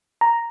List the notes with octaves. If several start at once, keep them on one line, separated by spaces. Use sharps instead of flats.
A#5